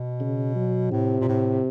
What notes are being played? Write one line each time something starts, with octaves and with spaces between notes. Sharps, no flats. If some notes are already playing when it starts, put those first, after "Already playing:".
Already playing: B2
C#3
F#3
A2 C3
A#2
A2